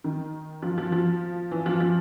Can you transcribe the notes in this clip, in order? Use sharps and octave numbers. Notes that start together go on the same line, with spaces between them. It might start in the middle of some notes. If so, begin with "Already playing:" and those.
D#3
F3
F3
F3
E3
F3
F3